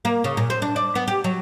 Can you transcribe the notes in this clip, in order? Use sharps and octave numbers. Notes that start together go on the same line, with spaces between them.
A#3
C#3
A#2
C4
D4
D5
B3
G4
F#3